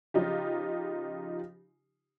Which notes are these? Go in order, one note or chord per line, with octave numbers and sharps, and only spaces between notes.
C#3 F3 D#4 F4 G4